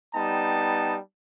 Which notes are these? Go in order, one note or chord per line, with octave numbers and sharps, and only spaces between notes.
G3 B3 D#4 G5 A5